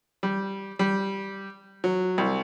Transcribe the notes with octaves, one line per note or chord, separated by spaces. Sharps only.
G3
G3
F#3
C2